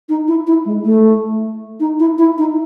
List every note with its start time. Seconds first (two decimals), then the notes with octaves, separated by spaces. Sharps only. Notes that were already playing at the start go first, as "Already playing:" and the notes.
0.09 D#4
0.28 E4
0.47 E4
0.66 G#3
0.85 A3
1.80 D#4
1.99 E4
2.18 E4
2.38 D#4